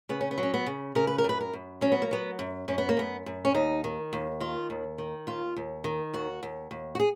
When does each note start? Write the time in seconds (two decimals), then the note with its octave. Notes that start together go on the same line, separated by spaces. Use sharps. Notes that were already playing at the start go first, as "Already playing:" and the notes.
0.09 C#3 B3
0.21 C#4
0.31 B3
0.38 F#3
0.43 C#4
0.54 B3
0.66 C#3
0.95 C#3 A#4
1.07 B4
1.18 A#4
1.24 F#2 B4
1.41 A#4
1.53 F#2
1.81 F#3 C#4
1.92 B3
2.02 A#3
2.11 F#3 B3
2.39 F#2
2.68 F#2 C#4
2.78 B3
2.89 A#3
2.97 F#2 B3
3.26 F#2
3.45 C#4
3.54 D#2 D#4
3.84 D#3
4.13 D#2
4.40 D#3 F4
4.70 D#2
4.98 D#3
5.27 D#2 F4
5.56 D#2
5.84 D#3
6.13 D#2 F#4
6.43 D#2
6.71 D#2
6.95 F#4
7.00 G#4